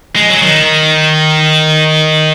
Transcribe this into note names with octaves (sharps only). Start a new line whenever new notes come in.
G#3
F#3
D#3